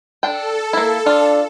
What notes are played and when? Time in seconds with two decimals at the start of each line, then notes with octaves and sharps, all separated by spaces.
0.23 D4 A4 G5
0.73 A#3 E4
1.06 D4 F4